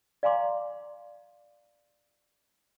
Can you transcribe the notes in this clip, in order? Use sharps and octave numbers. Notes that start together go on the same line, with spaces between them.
D5 F5 G#5 A#5 C6 D6